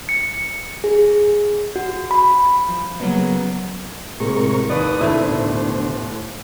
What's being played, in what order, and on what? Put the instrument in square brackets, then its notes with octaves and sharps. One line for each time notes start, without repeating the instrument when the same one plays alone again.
[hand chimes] C#7
G#4
F#4
B5
[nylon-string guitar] F3
C#3 F#3 G3 A#3 B3 C#4
[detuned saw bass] A2 [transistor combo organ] C3 A#4 C#6 [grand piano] G#3
[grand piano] D#2 B4 D5 [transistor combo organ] D#6
[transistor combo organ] D2 B2 C5 [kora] A3 E4